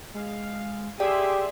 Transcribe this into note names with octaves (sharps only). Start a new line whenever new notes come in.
G#3 F5
G4 G#4 D5 E5 C6 D6